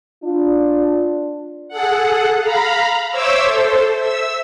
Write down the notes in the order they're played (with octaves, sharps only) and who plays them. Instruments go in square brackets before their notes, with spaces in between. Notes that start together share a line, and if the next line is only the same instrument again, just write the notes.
[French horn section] D4 F4
[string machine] G#4 A4 F#5
F5 A#5 B5
C5 C#5 E5 D6 E6
A4 C5
E5 E6